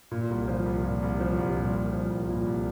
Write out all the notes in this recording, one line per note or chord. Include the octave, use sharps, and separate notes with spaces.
A#2
C2
F3
C2
A#2
C2
F3
C2
A#2
C2
F3
C2
A#2
C2